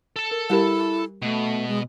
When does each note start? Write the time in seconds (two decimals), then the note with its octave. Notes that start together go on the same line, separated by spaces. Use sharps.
0.16 A4 A5
0.31 A#4
0.50 G3 E4 G4 A#4
1.22 B2 A3
1.68 G#3